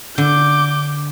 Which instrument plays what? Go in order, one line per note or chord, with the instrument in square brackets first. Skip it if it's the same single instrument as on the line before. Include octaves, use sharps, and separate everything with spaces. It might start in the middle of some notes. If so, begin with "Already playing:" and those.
[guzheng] D3 [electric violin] D6 G6